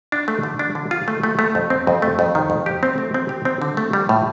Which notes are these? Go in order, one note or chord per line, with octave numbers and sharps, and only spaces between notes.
D4
A3
D3
D4
D3
F4
A3
A3
A3
F2
C4
F2
A3
F2
D#3
F2
G4
C4
A3
C4
G4
C4
D3
A3
G3
A2